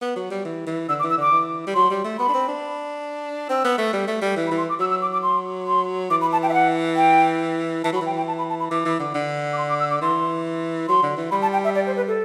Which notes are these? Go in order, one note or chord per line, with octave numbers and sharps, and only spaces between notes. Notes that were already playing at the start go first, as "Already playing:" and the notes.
B3
F#3
G3
E3
E3
D3 E6
D6
E3
E6
D3 D6
E3
G3
F#3 C6
G3
A3
B3 B5
D4
C4
D4
C4 E6
B3
A3
G3
A3
G3
E3
B5
E3
C6
D6
F#3 E6
E6
D6
D6
C6
C6
E3 D6
B5
A5
G5
E5
F#5
G5
E3 A5
F#3 B5
E3 G5
G5
A5
B5
A5
B5
E3 D6
E3
D3
D3
D6
C6
D6
E6
D6
E3 C6
F#3 C6
D3
E3
G3 B5
A5
G5
E5
D5
C5
B4
A4